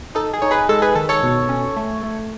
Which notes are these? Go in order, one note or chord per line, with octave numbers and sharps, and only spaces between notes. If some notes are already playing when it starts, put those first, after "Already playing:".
D#4 A4
G#4
D#4 C#5
G#4 B4
G#3 A4
G#4 B4
D#3 A4
A4 C#5
B2
C#4
A3
A3